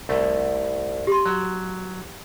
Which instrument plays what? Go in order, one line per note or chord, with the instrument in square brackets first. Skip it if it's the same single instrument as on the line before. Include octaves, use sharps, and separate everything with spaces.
[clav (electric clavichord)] C2 A3
[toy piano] G4 C6
[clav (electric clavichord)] F#3